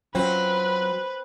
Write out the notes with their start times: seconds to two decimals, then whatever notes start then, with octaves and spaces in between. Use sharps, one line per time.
0.15 F#3 C4 C#4 F4 B4